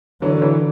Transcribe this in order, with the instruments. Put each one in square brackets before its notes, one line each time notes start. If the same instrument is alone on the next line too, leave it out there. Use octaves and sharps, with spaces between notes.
[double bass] D3 [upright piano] E3 F#3
[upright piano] E3 F#3